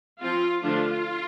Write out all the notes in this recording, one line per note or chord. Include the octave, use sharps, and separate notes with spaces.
F3 C4 F4
D3 F3 A3 D4 F4